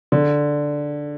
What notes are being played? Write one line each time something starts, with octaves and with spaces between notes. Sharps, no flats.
D3